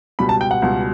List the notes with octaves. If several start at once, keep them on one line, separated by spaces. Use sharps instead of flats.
C#2 B2 G3 B5
A5
G5
F#5
C#2 B2 G3